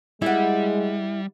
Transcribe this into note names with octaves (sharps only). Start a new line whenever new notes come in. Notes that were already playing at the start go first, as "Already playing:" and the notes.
G3 G#3 E4 F#5